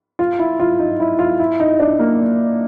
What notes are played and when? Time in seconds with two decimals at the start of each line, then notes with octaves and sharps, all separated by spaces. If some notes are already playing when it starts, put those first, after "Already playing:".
0.19 F4
0.39 E4
0.60 F4
0.79 D#4
1.00 E4
1.19 F4
1.39 E4
1.60 D#4
1.80 D4
1.99 A#3